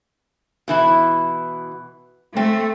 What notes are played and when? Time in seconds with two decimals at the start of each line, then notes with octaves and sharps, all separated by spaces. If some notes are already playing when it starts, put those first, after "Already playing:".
0.68 B2 E3 E4
2.37 A3 C4